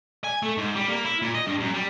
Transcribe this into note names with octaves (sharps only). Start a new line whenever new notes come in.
G#5
A3
G#2
G3
A#3
E4
A#2
D#5
G2
F#2
G3